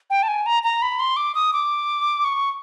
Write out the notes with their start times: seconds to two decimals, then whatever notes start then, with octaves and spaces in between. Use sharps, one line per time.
0.10 G5
0.23 A5
0.28 G#5
0.46 A#5
0.63 A#5
0.82 B5
1.00 C6
1.17 D6
1.35 D#6
1.53 D6
2.24 C#6